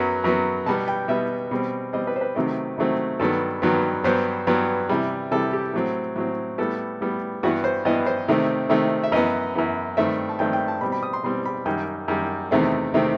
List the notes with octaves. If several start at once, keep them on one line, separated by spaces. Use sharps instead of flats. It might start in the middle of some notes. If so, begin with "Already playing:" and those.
Already playing: F#2 F#3 B3
F#2 F#3 B3
B2 G3 B3 A5
G5
B2 G3 B3 E5
B2 G3 C4
B2 G3 C4 D#5
B4
C5
B4
C3 D#3 F#3 A3 C4
C3 D#3 F#3 A3 C4
G2 D#3 F#3 B3 A4
G2 D#3 F#3 B3
G2 F#3 B3 C5
G2 F#3 B3
C3 E3 G3
C3 E3 G3 A4
G4
A2 F#3 C4 A4
A2 F#3 C4
A2 G3 B3 A4
A2 G3 B3
G2 E3 B3 F#4
C5
G2 E3 B3 D#5
C5
C3 D#3 A3 C4
C3 D#3 A3 C4
E5
F#2 E3 B3 D#5
F#2 E3 B3
G2 D#3 A3 C4 E5
A5
G2 D#3 A3 C4 G5
G5
A5
B2 G3 C4 B5
B5
D#6
C6
B2 G3 C4 C6
B5
F#2 D#3 G3 G5
F#2 D#3 G3
E2 C3 D#3 A3 C4
C3 D#3 A3 C4